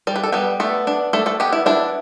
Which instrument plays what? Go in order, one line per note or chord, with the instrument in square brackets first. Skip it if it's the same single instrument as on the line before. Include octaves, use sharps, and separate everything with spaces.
[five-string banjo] G3 D5
B4
A4
G3 B3 B4
A3 B3 A4
D4
A3 D4 A4
A3 A4
B3 G4
E4
D4 E4